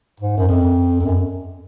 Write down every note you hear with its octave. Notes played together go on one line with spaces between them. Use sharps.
G#2
F#2
F2
F2
F#2